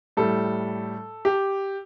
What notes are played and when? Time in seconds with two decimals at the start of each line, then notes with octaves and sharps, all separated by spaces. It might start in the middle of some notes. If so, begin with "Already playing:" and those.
0.17 A2 G3 A4
1.25 G4